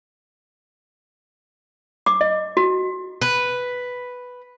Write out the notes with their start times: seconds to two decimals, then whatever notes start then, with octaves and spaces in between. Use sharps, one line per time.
2.06 D6
2.21 D#5
2.57 F#4
3.22 B4